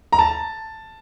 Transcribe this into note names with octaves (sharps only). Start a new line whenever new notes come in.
A#5
A5